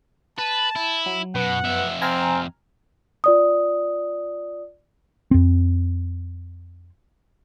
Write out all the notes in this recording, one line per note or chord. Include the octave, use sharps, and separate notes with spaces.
B4 A5 A6
E4
F#3
F#2 B2 B3 F#5
F2 E5
C4 G#5 A#5 F6
F4 D5 D#6
F2 C4